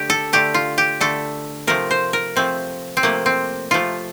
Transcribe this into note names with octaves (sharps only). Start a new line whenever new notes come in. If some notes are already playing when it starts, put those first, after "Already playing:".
Already playing: D3 A3 G4
A4
D3 A3 G4
F4
G4
D3 A3 A4
C3 F3 A3 A#4
C5
A#4
C3 F3 A3 C4
C4
C3 F3 A3 A#3
C4
C3 F3 A3 F4